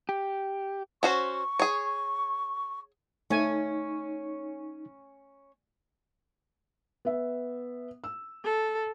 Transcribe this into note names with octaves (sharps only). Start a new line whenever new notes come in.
G4
C#4 F#4 C5 C#6
G#4 C#5
A3 C#4 D#4 G#5
B3 E5
E6
A4